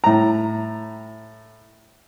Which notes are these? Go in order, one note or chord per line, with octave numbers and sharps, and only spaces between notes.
A2 A#5